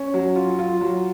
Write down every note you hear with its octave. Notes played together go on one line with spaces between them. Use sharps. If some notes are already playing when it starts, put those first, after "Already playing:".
Already playing: C#4
F#3
F4
F4
F#3